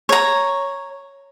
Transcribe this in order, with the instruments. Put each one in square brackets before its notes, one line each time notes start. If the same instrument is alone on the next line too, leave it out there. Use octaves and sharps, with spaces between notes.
[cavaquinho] C#5 A#5